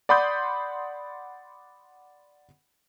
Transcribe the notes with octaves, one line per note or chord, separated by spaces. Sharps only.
D5 F#5 B5 C6 D#6 G6